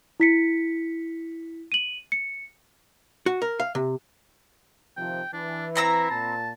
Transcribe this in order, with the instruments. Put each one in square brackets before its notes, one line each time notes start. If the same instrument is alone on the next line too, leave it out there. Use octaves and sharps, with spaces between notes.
[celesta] E4 B6 C#7
D#7 F#7
C#7
[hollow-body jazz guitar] F#4
A#4
F5
C3
[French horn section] C3 D#3 F3 [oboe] G5
[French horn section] E3 [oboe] D4
[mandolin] C4 A#5 B5 [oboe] E4
[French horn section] A#2 [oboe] A5